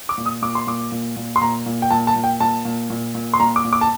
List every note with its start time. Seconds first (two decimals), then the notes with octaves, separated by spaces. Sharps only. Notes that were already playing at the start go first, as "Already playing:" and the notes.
0.09 D6
0.18 A#2
0.26 D#6
0.42 A#2 D6
0.55 C6
0.67 A#2 D6
0.92 A#2
1.16 A#2
1.36 C6
1.41 A#2 A#5
1.66 A#2
1.82 G5
1.91 A#2 A5
2.07 A5
2.16 A#2
2.24 G5
2.40 A#2 A5
2.65 A#2
2.90 A#2
3.15 A#2
3.34 C6
3.40 A#2 A#5
3.56 D6
3.64 A#2
3.73 D6
3.81 A5